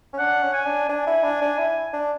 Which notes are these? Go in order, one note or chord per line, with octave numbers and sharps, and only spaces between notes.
C#4
D4 F#5
C#4
G#5
D4
D4 G#5
E4
D4
D4
E4
D4